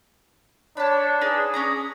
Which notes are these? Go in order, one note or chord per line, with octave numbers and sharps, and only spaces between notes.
D4 C#5 A5 B5
D#4 G#4 B4
C#4 D5 A#5